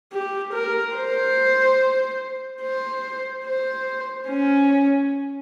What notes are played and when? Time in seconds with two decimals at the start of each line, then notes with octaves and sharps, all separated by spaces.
0.13 G4
0.53 A#4
0.96 C5
2.62 C5
3.45 C5
4.28 C#4